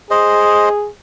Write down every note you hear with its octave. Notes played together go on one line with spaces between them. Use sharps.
G#4 C5 D#5